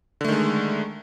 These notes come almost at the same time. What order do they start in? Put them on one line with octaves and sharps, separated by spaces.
D3 A3 D#3 G#3